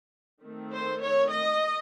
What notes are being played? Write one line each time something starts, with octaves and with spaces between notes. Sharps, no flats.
D#3 A3 C4
C5
C#5
D#5